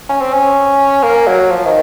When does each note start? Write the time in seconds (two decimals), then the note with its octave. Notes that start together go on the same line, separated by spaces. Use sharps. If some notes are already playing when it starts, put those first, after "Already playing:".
0.09 C#4
0.21 C4
0.34 C#4
1.03 A#3
1.27 F#3
1.51 F3
1.66 D#3